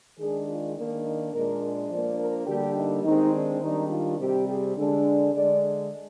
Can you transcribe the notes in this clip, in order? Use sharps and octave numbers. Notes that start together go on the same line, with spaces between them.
D#3 G#3 D4 G#4
F4
D#3 A#3 D4 D#4
D#4
A#2 G#3 D4 A#4
D5
F3 A#3 D4 D5
A#4
D3 G3 A#3 D4 G4
D#4
D#3 G#3 C4 D#4
D4
D#3 G3 D4 D#4
F4
C3 G3 C4 G4
G#4
D3 G#3 D4
D3 G#3 D4 D5